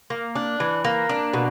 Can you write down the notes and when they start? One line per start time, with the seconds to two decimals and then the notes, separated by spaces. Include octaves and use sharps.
0.10 A#3
0.36 D4
0.60 E3
0.84 A#3
1.09 D4
1.33 B2